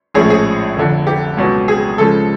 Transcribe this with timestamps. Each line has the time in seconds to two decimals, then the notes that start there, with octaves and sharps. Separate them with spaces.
0.14 A#1 A2 F3 G#3 C#4 G#4
0.30 G#4
0.76 F1 F2 D3
1.07 G4
1.37 C#2 B2 F#3
1.68 G#4
1.98 C#2 C#3 F3 G#3 A4